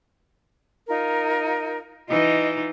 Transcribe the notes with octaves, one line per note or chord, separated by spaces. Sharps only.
D#4 F4 A#4
E3 D#4 F4 D#5